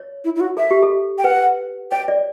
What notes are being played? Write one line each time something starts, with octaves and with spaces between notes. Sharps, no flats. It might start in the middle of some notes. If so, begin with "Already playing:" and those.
Already playing: C#5
E4
E4
F#4
A4 E5
G4
A4
G5
B4 F#5
C#5 G5
D5